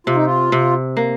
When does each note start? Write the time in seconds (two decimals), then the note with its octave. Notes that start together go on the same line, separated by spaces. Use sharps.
0.07 C3 F4
0.16 D#4
0.26 F4
0.52 C3
0.97 A#3